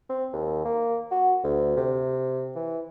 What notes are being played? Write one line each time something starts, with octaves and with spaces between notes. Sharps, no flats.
C4
D#2
A#3
F#4
D2
C3
E3